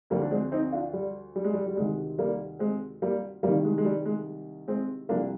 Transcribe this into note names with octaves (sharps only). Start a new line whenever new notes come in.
D2 D3 F3 G3 A#3
D4
G#3 C4
C4 D#4
D4 F4
G3
G3
G#3
G3
G3
D2 C3 D#3 G#3
G3 A#3
G#3 C4
G3 A#3
C2 C3 D#3 G3 A#3
G#3
G#3
G3
G#3
G#3 C4
C2 C3 F3 A#3 D4